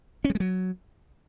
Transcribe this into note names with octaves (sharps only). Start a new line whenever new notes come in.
C#4
G3
G#3
F#3